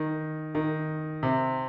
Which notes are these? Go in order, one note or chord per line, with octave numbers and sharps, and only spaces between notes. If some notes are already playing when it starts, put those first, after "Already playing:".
Already playing: D#3
D#3
C3